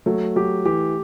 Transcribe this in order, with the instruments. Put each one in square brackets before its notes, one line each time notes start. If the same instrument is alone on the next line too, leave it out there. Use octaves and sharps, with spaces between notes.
[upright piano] F#3 [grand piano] A3
[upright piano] F#3 [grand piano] G4
[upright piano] E3 [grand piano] G4